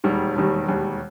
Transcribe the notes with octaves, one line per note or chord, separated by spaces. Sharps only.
E1 D#2 D#3 G3
E1 D#2 D#3 G3
E1 D#2 D#3 G3